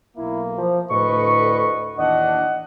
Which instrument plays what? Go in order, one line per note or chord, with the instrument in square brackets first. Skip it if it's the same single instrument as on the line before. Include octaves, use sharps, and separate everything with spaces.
[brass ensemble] B1 A#3 [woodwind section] E4
[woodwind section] F3
[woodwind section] D2 D#5 C#6 [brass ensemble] A2 D3 B4
[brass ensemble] D#2 E3 D4 [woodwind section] D#5 F#5